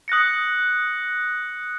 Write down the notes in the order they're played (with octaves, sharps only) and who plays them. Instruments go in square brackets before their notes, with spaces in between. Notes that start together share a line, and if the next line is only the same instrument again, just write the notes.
[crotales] D#6 F#6 A#6 C#7